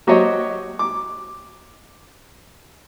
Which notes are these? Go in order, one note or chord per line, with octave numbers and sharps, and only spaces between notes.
F#3 F#4 G4 C5 C#5 D#5
D6